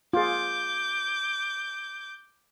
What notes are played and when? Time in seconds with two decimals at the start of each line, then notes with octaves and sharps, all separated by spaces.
0.13 F4 G#4 D6 G6